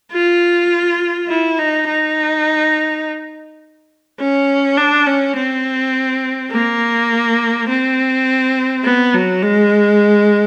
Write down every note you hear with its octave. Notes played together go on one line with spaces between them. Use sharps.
F4
E4
D#4
D#4
C#4
D4
C#4
C4
A#3
C4
B3
F#3
G#3